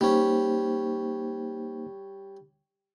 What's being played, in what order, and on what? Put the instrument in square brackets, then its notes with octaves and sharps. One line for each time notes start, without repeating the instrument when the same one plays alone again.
[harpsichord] G3 C#4 [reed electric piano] A#3 D#4 C5